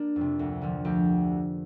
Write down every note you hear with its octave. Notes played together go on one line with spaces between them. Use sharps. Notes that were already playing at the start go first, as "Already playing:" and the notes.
Already playing: A#3 D4
F2
C3
D2
D3 F3
D2 G4